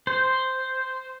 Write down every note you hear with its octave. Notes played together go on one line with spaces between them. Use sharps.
C5